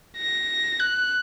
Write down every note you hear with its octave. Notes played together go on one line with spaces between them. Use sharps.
A#6
F#6